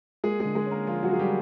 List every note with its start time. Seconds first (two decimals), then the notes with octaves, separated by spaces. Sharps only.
0.24 G#3 A#3 G#4
0.40 D3 G#3 G#4
0.55 G#3 G#4
0.66 C#4
0.71 A#3 A#4
0.87 F3 F4
1.03 F#3 F#4
1.08 F3 G#4
1.19 G3 G4